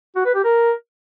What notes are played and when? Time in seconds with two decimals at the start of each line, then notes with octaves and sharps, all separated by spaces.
0.16 F#4
0.25 B4
0.35 G4
0.44 A#4